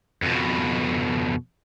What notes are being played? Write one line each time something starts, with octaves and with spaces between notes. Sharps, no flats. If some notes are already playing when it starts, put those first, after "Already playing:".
F2 B2